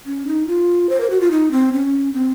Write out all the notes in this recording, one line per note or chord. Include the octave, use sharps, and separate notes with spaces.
C#4
D#4
F4
C5
A#4
F#4
F4
D#4
C4
C#4
C4